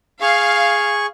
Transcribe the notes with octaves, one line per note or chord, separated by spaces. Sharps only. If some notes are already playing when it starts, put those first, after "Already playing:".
G#4 F5 C#6